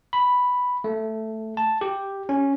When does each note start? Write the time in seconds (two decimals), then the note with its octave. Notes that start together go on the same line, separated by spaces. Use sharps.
0.13 B5
0.84 A3
1.57 A5
1.81 G4
2.29 C#4